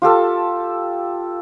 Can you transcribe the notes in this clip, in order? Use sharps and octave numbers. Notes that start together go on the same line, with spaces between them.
F4 G4 A4 A5